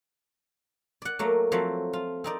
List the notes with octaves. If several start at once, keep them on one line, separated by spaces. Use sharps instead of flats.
D5 F#5
F#3 A3 A#3
F3 F#3 A3 C4
F4
C4 D#4 D5